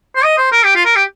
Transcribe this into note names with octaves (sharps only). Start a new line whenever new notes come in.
C5
D#5
C5
A#4
G4
F4
A#4
G4